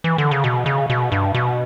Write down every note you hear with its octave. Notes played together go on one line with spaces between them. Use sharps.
E3
D3
C#3
B2
C#3
B2
G2
B2